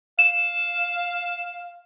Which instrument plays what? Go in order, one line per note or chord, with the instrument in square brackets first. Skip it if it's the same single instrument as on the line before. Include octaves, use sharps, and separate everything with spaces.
[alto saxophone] F5 [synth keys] E7